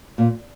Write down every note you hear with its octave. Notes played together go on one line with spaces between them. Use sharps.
A#2